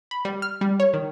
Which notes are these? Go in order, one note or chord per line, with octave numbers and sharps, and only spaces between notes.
B5
G3
F6
G3
C#5
D#3